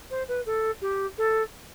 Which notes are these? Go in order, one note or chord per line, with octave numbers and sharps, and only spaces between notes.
C5
B4
A4
G4
A4